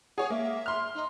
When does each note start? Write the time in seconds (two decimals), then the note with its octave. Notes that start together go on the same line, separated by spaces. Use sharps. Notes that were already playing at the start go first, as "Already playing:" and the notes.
0.18 G#4 C#5 F#5
0.30 A#3 E5
0.66 C6 F6
0.95 D#4